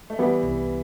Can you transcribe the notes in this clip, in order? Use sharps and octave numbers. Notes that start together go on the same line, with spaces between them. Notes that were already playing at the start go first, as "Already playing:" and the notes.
A3
E3 G3 B3
C2